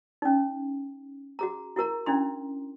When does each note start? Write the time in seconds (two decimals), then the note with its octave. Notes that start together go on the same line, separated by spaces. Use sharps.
0.22 C#4 D#4
1.39 F#4 G#4 A#5
1.76 E4 F#4 A#4 A#5
2.06 C#4 D4 E4 C6